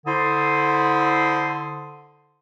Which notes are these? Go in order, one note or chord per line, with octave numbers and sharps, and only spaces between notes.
D3 E4 C5 C6 D#6